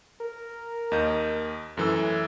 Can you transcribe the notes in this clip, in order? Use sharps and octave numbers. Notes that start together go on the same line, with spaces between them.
A#4
D#2 D#5 G6
F#2 E3 A3 E6